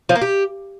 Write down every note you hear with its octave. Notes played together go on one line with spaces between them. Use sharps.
F3
A#3
G4